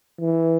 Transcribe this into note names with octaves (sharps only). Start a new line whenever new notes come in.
E3